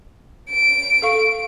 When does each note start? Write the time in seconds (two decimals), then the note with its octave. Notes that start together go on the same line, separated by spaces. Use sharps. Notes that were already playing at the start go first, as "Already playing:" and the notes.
0.50 D7
1.02 A4 F5 C#6